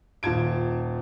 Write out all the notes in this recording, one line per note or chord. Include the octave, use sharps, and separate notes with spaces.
D#1 F4 A5 G#6 D7